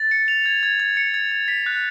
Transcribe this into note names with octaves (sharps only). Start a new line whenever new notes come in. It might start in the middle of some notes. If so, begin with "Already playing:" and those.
Already playing: A6
C#7
F7
G#6
G#6
G#6
C#7
G#6
G#6
B6
F#6